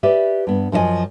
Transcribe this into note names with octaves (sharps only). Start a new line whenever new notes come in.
G4 B4 D5 E5
G2 B3
F#2 F3 E4 D#5 G#5